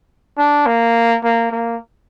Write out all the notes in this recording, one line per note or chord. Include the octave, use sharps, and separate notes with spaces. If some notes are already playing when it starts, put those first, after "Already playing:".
D4
A#3
A#3
A#3